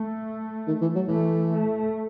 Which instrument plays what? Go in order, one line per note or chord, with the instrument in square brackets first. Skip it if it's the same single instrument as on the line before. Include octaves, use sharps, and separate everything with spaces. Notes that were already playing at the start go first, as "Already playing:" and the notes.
Already playing: [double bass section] A3
[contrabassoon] D#3
E3
F#3
[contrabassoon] E3 [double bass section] A3
[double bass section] A3